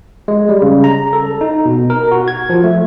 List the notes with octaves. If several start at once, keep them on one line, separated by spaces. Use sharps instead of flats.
G#3
G3
C#3
A#5
A4
D#4
B2
A#4
F#4
G#6
F3
A3